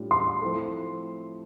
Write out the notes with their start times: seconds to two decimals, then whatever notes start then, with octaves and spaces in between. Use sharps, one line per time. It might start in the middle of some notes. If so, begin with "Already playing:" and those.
Already playing: A2 G3 D4 F4
0.11 C6
0.42 F3 A3 C4 E4 A4